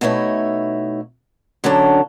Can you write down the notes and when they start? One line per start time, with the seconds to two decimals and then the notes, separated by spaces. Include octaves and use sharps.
0.01 B2 A3 D#4 E4 C#5
1.64 D3 F#3 C#4 D4 A4 A#5